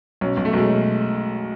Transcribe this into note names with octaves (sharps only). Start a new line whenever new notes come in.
B1 C#4
B1
A3
B1 G#3